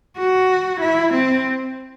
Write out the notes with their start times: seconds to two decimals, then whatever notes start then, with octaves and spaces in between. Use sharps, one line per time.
0.18 F#4
0.81 E4
1.14 C4